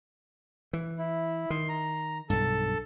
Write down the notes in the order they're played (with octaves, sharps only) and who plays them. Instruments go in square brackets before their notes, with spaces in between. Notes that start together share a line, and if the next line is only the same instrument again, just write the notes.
[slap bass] E3
[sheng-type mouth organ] E4
[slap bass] D#3 [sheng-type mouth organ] C6
[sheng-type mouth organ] A#5
[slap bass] B1 G2 [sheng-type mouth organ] A4 A5